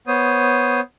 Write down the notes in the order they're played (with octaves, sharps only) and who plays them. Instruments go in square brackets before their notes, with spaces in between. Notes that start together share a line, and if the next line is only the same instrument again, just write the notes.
[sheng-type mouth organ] B3 C5 C#5 D#6